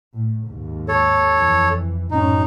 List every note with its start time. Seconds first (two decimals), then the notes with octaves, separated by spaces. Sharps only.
0.15 A2
0.45 D#2 G#2
0.88 A4 C#5
1.32 F2 E3
2.11 F#2 A2 C#4 D#4